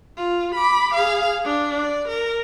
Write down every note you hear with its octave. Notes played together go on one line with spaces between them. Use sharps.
F4
B5 D6
G#4 F5
D4
D5
A#4